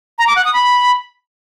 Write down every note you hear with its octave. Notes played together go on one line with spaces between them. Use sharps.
A#5
D6
F#5
D#6
B5